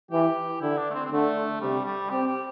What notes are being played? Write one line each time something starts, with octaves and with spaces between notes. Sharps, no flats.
E3 G4
D3 E4
D4
A3
C4
C4
D3 A3
C3 G3
G3
C4 G4
G4